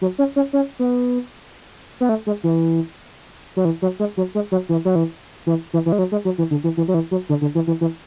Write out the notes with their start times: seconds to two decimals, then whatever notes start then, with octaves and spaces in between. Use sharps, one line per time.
0.02 F#3
0.19 C#4
0.36 C#4
0.53 C#4
0.79 B3
2.01 B3
2.09 A3
2.27 G#3
2.44 E3
3.56 F#3
3.65 E3
3.82 F#3
4.00 G#3
4.17 F#3
4.35 G#3
4.52 F#3
4.69 E3
4.85 F#3
4.95 E3
5.47 E3
5.73 E3
5.86 E3
5.92 G#3
5.99 F#3
6.12 G#3
6.25 F#3
6.38 E3
6.51 D3
6.64 E3
6.77 E3
6.88 F#3
6.94 E3
7.11 F#3
7.29 D3
7.41 D3
7.55 E3
7.67 E3
7.81 E3